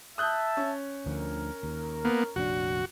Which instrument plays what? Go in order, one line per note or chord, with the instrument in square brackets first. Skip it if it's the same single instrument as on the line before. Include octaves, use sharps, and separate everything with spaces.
[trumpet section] E5 A5 [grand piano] D#6 F#6 G6
[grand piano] C#4
[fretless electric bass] D2 D3 F3 [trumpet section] A#4
[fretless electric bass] D#2
[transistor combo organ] A#3 B3
[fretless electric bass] F1 A#1 D4 [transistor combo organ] F#4